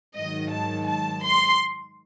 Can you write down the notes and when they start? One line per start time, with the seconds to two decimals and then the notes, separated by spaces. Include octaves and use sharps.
0.18 G#2 D#3 F#3 D#5
0.53 A5
0.88 A5
1.23 C6